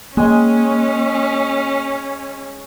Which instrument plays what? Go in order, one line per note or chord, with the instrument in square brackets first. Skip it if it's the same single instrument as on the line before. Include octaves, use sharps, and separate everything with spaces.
[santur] G#3 D#5 G#5 [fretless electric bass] A#3 [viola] C#4